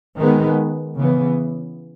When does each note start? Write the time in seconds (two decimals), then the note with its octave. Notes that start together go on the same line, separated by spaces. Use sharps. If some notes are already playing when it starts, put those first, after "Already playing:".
0.17 D#3 G#3 B3
0.95 C#3 E3 B3